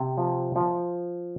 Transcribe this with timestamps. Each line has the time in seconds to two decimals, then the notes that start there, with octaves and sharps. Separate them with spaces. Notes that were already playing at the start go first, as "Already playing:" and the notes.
Already playing: C3
0.18 F3
0.56 F3